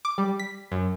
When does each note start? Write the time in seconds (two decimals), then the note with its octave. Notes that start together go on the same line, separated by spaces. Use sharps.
0.05 D6
0.18 G3
0.39 B6
0.72 F#2